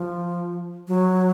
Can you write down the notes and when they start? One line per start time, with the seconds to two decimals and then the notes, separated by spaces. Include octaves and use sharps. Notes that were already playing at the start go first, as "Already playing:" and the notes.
Already playing: F3
0.88 F#3